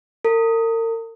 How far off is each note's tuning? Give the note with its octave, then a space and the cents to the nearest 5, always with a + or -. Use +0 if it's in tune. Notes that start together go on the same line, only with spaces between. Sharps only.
A#4 -40